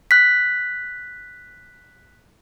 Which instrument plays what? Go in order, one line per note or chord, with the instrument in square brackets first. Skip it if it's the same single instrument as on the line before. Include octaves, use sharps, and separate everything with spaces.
[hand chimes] F#6 B6